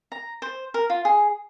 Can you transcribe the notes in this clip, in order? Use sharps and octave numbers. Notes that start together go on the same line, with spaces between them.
A#5
C5
A#4
F4
G#4